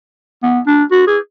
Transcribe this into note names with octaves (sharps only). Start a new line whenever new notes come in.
B3
D4
F#4
G#4